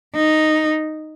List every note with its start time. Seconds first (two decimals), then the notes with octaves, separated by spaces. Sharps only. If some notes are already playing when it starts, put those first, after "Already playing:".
0.16 D#4